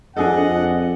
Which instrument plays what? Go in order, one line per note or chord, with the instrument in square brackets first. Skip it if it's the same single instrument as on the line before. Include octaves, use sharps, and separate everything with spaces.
[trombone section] F2 [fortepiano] D4 G#4 A4 [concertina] D#5 [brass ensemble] F#5